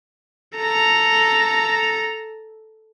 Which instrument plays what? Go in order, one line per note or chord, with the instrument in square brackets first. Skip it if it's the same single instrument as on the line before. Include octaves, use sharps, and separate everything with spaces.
[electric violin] A4 A#5